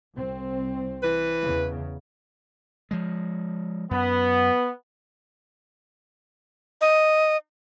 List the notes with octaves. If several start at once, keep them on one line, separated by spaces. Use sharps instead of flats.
C2 C4
E3 B4
E2 C#3
F3 G#3
F#2 B3
D#5